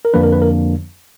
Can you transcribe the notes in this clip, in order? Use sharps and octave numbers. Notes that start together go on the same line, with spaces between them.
A#4
F2 D3 F3 A#3 D4 B4
A#4
B4
A#4